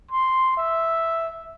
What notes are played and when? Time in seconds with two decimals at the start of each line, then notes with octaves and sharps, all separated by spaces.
0.11 C6
0.58 E5